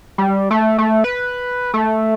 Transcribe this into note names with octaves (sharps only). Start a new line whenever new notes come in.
G3
A3
A3
B4
A3